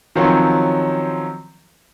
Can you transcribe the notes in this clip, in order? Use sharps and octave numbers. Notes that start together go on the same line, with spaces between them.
D#3 F3 F#3 C4 C#4